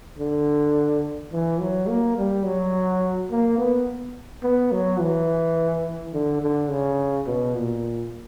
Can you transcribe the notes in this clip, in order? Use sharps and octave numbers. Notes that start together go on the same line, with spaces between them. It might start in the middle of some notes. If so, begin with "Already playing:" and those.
D3
E3
F#3
A#3
G3
F#3
A#3
B3
B3
F#3
E3
D3
D3
C#3
B2
A#2